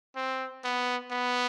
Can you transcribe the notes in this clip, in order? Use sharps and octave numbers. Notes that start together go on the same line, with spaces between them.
C4
B3
B3